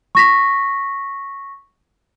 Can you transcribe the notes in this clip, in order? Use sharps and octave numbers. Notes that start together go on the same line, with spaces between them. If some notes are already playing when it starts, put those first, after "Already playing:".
C#6 A#6 B6